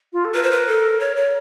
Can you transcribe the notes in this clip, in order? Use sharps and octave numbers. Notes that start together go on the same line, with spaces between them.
F4
A4
A#4 B4
C5
B4
A4
C#5
C#5